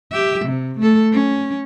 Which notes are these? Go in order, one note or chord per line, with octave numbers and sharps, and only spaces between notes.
G4 E5
C3
A3 A4
C#4